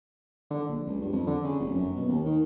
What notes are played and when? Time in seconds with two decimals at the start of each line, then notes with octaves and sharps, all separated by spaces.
0.51 D3
0.69 A#1
0.87 C#2
1.01 G2
1.13 F2
1.27 D3
1.44 C#3
1.60 F1
1.75 F#2
1.96 B2
2.09 D#2
2.25 D#3